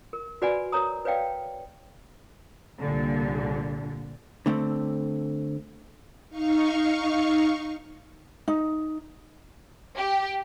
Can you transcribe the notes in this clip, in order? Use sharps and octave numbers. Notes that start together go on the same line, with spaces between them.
A#4
F#4 B4 D5 F#5 G#5 B5
A#4 C#5 A#5 D#6
B4 C#5 D5 F5 G5
C2 A#2 D3
D3 A3 C4
D#4 F5 C#6
D#4
G4